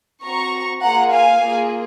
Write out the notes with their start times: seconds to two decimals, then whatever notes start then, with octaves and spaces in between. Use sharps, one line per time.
0.23 C4 F#4 A#5 C#6
0.82 A#3 F4 G#4 F#5 A#5
1.11 F5 G#5
1.40 A#3 F4 G#4